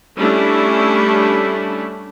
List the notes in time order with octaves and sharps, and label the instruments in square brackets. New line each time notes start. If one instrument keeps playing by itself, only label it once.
[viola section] G3 A3 C#4 D4 E4